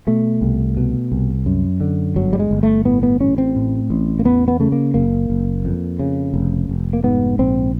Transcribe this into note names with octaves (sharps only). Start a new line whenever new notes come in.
B2 A3
C2
B2
C2
F#2
D3
G1 F#3
G3
G#3
G1
A3
A2 B3
B3
A1 C#4
C4
A2
A1
A#3
E2 B3
B3
C#3 A3
A#3
F#1 A#3
F#1
F2
C#3
F1
F1
A#3
G#2 B3
A#1 C4